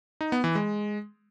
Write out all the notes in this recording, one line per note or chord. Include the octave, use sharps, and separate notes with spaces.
D#4
B3
E3
G#3